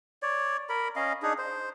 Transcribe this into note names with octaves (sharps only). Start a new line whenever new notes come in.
C#5 D5
A#4 B5
C#4 D#5 F5
D4 D#4 G#4
C5